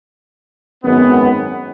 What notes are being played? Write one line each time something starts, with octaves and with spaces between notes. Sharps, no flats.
G#1 F#2 D#3 G#3 B3